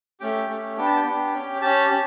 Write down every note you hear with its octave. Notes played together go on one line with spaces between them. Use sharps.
A3 C#4 G4 G5
A3 C#4 G4
B3 D4 G4 G5
A5
G5
B3 D4 G4
C#4 G4
C#4 G4 A5
C#4 G4